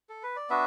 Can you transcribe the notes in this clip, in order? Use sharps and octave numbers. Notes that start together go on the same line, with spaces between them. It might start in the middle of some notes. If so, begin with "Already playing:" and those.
A4
B4
D5
B3 D4 F#4 B4 E5